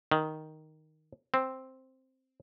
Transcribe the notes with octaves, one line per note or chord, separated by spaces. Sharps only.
D#3
C4